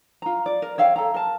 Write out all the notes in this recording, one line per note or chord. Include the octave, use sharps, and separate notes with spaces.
F4 A#5
D5
A#4
C#5 E5 F5 G5
A4 A#5
A#4 A5